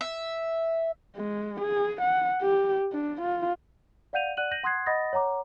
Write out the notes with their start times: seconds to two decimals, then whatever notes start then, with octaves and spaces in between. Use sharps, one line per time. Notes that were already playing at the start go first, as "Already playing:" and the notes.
0.01 E5
1.16 G#3
1.61 G#4
2.02 F#5
2.42 G4
2.92 D4
3.22 F4
4.13 D5 F5 F#5 G6 D#7 F7
4.37 D5 F#5 F#6 D#7 F#7
4.51 G6 A#6 D#7 F#7
4.63 F#5 C6 D#6 F#6 G#6 C7
4.86 D#5 F#5 B5 D#6 A6 A#6
5.13 C#5 F#5 A#5 D6